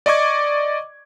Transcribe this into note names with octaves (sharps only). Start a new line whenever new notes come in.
D5 D#5 C#6 D6 G#6